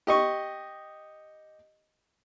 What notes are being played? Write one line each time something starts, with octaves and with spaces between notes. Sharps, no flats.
G4 D#5 C#6